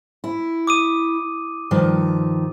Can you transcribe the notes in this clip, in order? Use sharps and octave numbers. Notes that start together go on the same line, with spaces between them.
E4
D6 D#6 D#7
G2 D#3 F3